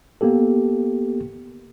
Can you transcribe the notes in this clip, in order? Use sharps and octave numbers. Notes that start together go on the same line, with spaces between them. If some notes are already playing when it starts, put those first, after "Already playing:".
A#3 B3 G4 A4